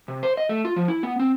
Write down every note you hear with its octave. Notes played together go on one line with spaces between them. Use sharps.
C3
C5
D#5
A3
F4
F3
E4
B3
C4